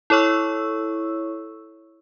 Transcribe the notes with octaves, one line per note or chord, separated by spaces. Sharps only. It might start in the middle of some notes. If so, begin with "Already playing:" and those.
E4 A4 C#5 C#6 E6